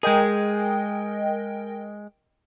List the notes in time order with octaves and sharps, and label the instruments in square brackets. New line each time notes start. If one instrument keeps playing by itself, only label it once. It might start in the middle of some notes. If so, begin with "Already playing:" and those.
[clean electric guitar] G#3 G#4 [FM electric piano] A#4 D#5 G5